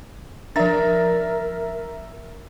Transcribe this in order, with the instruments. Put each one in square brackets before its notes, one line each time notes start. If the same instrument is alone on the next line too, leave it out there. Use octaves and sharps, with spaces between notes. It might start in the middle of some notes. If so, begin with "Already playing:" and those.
[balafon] F3 D4 [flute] A#4 [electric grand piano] E5 A#5 A6